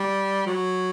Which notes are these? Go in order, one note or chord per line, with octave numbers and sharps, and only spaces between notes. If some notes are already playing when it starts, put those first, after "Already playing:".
Already playing: G3
F#3